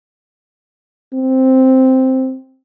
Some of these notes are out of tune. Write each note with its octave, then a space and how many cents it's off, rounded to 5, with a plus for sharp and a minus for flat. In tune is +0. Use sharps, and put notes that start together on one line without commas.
C4 +0